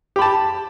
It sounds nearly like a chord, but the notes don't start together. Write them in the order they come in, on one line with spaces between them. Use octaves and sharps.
G4 B5 A5